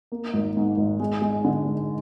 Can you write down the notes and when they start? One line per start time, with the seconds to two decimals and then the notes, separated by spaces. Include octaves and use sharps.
0.12 A#3
0.34 G#1
0.57 G#2
0.77 G#1
1.00 G#3
1.22 G#3
1.44 D3
1.65 G#3